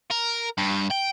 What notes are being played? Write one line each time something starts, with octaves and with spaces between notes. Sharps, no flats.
A#4
G2
G5